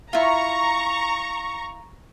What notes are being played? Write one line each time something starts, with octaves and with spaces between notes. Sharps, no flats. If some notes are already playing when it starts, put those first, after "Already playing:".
E4 F4 A#5 C#6